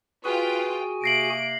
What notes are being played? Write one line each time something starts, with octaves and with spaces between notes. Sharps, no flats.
F4 F#4 G#4 B4 G5 G#5
C3 A#3 A#6 C7 D7 F#7